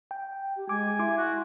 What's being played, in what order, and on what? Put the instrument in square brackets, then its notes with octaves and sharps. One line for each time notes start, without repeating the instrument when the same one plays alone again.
[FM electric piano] G5
[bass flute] G4
[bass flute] G#3 [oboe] G#5 [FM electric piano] D6
[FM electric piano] E4 C6 D6 [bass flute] E5
[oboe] F#4